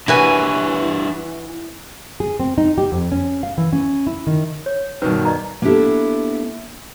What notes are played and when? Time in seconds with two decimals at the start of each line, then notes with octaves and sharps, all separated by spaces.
0.08 E3 D4 F#4 G4 B4 E5 G#5
2.20 G#4
2.40 C4
2.58 D#4
2.78 G4
2.92 F2
3.12 C#4
3.43 F5
3.58 E3
3.73 C#4
4.07 E4
4.27 D#3
4.66 C#5
5.02 G2 B2 D#3 B4
5.25 D5 D#5 A#5
5.62 A#3 B3 D4 E4 G4 A4